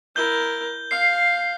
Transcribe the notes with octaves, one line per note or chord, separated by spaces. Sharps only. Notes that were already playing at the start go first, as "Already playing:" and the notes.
E4 A#4 G6 G7
F5 C7